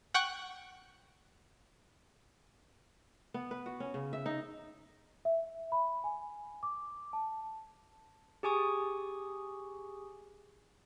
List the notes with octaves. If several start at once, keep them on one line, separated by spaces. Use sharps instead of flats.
F#5 G5 C#6 F#6
B3
B4
F#4
C#4
C#3
E5
D#4
E5
B5
G#5
D6
A5
G4 G#4 G#5 C#6 D#6